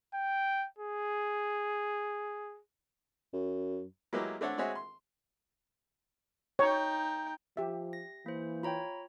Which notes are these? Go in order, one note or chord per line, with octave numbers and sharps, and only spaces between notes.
G5
G#4
F#2
F#3 G#3 A#3 B3 E4 G4
A3 C4 D4 A4 C#5 F#5
G#3 C4 F#4 G#4 C#5 E5
C6
D#4 C#5 G5
F3 G4 E5
A#6
E3 A#3 C5
F4 C#5 G5 A#5 B5